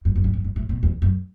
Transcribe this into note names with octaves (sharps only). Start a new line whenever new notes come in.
F#2
F#2
G2
F#2
G2
A2
B2
E2
F#2